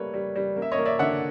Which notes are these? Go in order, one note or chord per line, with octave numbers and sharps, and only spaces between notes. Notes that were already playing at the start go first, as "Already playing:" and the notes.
Already playing: G3 A3 A#3 B4 C#5
G3
G3
A#3
E5
C#5 D#5
A#3
D5 E5
D3 E5 F#5